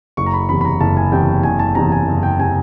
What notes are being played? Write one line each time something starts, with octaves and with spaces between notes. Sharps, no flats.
F#1 C#6
A#5
B5
E2 C3 B5
B5
A#5
F#1 A5
G#5
E2 C3 G5
G5
F#1 G#5
A5
E2 C3 A#5
G#5
F#1
G5
C3 G#5